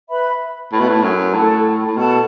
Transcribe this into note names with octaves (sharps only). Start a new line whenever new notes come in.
B4 E5 B5
A2 B4 E5 B5
B2
A2
F#2
A2 A4 F#5 A5
A2
B2 A4 F#5 A5